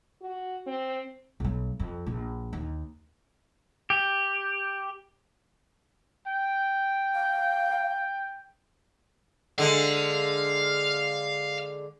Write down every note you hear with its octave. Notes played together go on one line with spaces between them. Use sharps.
F#4
C4
B1 F#3
F2
A#1
D#2
G4
G5
F5
D3 G#3 F5